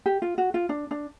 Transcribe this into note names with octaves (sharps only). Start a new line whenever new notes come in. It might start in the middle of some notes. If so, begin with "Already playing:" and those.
G4
F4
F#4
F4
D4
D4